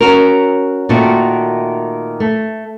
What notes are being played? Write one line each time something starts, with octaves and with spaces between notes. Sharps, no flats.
C#4 F#4 A#4
A#2 D#3 A3 F#4
A3